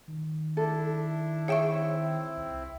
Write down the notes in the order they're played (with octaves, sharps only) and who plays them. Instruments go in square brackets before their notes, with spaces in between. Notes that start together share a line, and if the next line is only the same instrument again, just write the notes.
[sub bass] D#3
[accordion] D4 E4 [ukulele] A4
[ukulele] G#4 G5 [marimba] C#5 E5 C#6
[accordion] C4 E4
[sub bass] C2